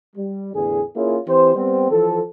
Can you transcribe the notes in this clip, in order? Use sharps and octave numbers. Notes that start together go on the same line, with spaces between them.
G3
A1 E2 D3 G#4
A#3 C#4 E4 F4 G#4
E3 C4 G4 C5
G3 B3 C4
E3 F3 A4